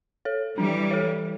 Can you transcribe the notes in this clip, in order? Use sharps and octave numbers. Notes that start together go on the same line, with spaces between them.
A4 C#5
E3 G3 D4
A4 C#5